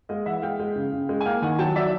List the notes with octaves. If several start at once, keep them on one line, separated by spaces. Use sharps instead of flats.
G#3 D#5 F5
E3 E5 F#5
G#3 F5 G5
G#3
C#3
C#3
G#3
G#5
A#3 F5 G5
D#3 F#5 G#5
F#3 G5 A5
F#3 D5 E5